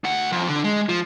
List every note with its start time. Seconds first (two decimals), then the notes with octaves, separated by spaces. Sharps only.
0.04 D2 F#5
0.32 F2
0.49 D3
0.64 G#3
0.89 F3